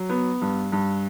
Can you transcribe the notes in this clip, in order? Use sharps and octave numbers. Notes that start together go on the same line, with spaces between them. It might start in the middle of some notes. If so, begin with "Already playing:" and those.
Already playing: F#3
B3
G2
G2